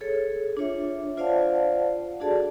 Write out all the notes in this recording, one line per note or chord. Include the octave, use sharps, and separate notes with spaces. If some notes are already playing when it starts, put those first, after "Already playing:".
G#4 A4 C#5
D4 F4 C#5 E5
F4 C5 D5 F5 F#5 A5
D4 F#4 G#4 A4 D5 A5